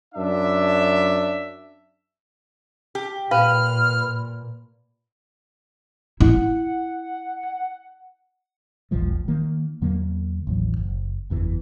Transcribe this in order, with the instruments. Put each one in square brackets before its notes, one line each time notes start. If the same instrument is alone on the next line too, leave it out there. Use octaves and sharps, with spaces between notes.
[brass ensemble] F#2 D4 E5
[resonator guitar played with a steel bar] G4
[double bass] A#2 [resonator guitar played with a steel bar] B4 [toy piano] F5 [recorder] F6
[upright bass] E4 [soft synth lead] F#5
[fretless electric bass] E1 A#1 F3 G#3
D#3 A#3
E2 D3 F#3 A#3
A1 D#2 F#3
F#1
F#1 E2 G2 E3